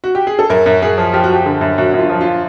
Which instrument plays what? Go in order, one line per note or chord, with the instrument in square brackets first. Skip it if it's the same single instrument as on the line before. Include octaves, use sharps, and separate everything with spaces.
[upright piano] F#4
G4
G#4
A4
[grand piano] F#2 [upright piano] A#4
[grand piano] F#2
[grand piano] F#2 [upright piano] G#4
[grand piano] F3
[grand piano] F3 [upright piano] G4
[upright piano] F#4
[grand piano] F3 [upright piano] G4
[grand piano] D3
F#2
[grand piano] F#2 [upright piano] F#4
[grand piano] F#2 [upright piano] F4
[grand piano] F3
[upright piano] F4